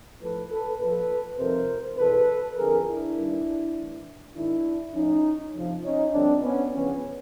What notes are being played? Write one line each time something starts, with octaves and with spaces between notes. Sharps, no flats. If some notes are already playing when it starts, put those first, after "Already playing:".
A2 F3 A4 B4
A4 B4
A#2 F3 A4 B4
F2 C3 D#3 A#4 C5
E2 B2 A4 B4
F2 D3 F3 G#4 A#4
D4 E4
G2 D#3
A2 E3
G#2 D#3 D4 E4
A2 F3 C#4 D#4
F2 C3 F3
C#4 D#4
G2 D3 F3 C4 D4
B3 C#4
E2 C#3 F3 B3 C#4